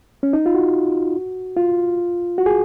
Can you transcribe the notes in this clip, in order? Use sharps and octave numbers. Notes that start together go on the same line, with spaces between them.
C#4
D#4
F4
F#4
F4
F#4
G#4